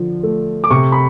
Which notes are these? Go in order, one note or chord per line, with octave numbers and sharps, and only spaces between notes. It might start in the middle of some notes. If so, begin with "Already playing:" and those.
Already playing: D3 F3
A3
D6
C3 C#6
B5